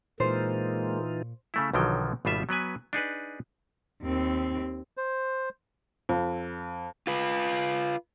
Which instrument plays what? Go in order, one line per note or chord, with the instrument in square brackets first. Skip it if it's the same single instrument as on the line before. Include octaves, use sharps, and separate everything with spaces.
[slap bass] A#2 [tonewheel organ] E3 D#4 F4 [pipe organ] G#3 A#3 [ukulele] C5
[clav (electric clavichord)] C#3 A3 E4
B1 D3 D#3 F3 F#3 G5
G#1 B2 G3 F4 C5 E5
F#3 B3 B4 G#5
D4 D#4 G#4 B4
[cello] D#2 C4
[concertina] C5
[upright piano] F2
[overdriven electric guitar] F4 B4